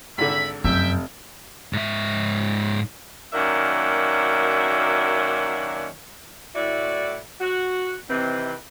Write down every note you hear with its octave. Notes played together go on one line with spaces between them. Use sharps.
G#1 D3 E5 B5
F1 F#2 E5 G5
G#2 E5
F#2 D#3 A#3 D4 F#4 E5
A2 E4 F#4 D5
F#4
C3 D#3 E3 C4 B4